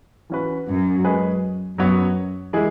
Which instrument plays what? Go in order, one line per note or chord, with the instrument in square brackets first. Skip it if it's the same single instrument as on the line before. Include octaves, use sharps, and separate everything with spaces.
[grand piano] E3 C#4 F#4 B4
[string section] F#2
[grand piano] G#3 C#4 G#4 B4
[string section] F#2 [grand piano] F#3 B3 F#4 C#5
[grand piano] E3 G#3 E4 G#4